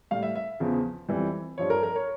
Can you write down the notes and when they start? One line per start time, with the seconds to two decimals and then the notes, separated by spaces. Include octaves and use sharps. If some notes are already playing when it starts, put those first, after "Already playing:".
0.11 A2 G3 F5
0.23 E5
0.35 E5
0.60 E2 C#3 F3
1.09 F2 E3 G3
1.58 G2 F3 C#5
1.70 A#4
1.83 A#4
1.96 C#5